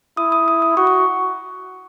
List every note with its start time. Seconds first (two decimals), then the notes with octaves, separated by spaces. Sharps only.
0.17 E4 D#6
0.32 D#6
0.48 D#6
0.62 D#6
0.77 F#4 C#6
0.87 C#6